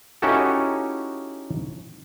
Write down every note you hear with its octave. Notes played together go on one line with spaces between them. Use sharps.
C#4 D#4 E4 F#4 G4 A4